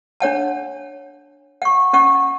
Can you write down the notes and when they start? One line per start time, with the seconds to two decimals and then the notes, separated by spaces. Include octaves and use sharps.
0.20 D4 C#5 F#5 A5
1.62 F#5 C#6
1.93 C#4 F#5 C#6